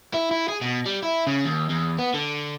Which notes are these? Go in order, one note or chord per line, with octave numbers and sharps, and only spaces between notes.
E4
E4
G#4
B2
G3
E4
C#3
D#2
E2
B3
D3